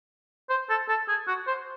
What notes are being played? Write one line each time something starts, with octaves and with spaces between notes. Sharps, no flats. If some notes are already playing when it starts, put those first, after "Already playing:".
C5
A4
A4
G#4
F#4
C5